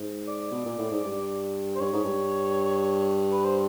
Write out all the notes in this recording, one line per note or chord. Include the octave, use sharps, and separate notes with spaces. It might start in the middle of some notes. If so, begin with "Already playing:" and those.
Already playing: G#2
D5
B2
A#2
A2
G#2
G2
C5
G2 C#5
G#2
G2
B4
C5